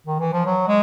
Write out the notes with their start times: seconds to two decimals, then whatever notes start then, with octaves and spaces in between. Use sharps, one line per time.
0.07 D#3
0.20 E3
0.33 F3
0.46 F#3
0.68 G#3